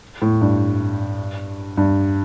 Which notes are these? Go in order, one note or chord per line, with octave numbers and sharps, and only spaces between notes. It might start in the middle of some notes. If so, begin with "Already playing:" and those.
A2
G2
G2